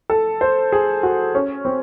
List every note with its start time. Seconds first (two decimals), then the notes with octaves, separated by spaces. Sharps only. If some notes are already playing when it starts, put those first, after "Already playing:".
0.10 A4
0.41 C5
0.72 G#4
1.03 F#4
1.34 C#4
1.65 C4